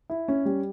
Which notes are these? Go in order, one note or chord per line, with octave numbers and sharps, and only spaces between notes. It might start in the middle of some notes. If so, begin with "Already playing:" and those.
E4
C#4
G3